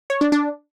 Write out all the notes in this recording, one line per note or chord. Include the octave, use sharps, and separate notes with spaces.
C#5
D4
D4